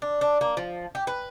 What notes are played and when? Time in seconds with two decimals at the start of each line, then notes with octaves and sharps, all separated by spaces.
0.02 D4
0.21 D4
0.41 A#3
0.57 F3
0.95 G4
1.07 B4